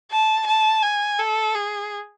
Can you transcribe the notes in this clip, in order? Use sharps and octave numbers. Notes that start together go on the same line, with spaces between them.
A5
A5
G#5
A4
G#4